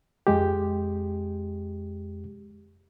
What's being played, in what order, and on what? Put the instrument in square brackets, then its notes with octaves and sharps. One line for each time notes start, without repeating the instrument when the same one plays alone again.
[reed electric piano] F2 G#3 G4